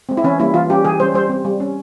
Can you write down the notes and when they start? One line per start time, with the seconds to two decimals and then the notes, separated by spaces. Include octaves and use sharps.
0.09 G#3 C4
0.17 E4
0.24 E3 C#4
0.39 G3 A#3 C#4 E4
0.54 E3 F4
0.70 G3 C#4 G4
0.85 E3 G#4
1.00 G3 C#4 C5
1.14 G3 C5
1.30 C4
1.45 G3
1.60 C#4